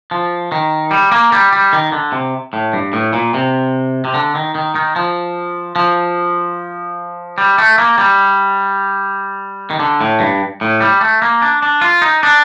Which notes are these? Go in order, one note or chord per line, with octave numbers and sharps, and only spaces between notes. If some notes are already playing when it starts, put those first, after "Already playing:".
F3
D#3
G3
A#3
G3
G3
D#3
D3
C3
A2
G2
A2
A#2
C3
C3
D3
D#3
D#3
D#3
F3
F3
G3
A3
A#3
G3
D#3
D3
A2
G2
A2
G3
A3
A#3
D4
D4
F4
D#4
D4